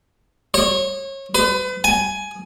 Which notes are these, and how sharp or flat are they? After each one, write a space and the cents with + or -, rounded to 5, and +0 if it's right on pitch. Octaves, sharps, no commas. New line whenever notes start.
C#5 -30
B4 +40
G#5 +15